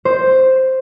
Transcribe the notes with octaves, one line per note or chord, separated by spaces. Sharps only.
C5